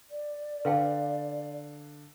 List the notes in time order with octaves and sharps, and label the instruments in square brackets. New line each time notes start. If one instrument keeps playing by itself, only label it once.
[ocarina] D5
[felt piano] D3 [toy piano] B4 F5 G5